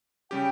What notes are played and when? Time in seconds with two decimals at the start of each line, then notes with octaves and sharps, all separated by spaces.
0.31 C#3 G3 C#4 G4 G5